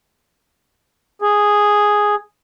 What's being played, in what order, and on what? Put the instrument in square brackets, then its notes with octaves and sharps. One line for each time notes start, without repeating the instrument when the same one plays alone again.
[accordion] G#4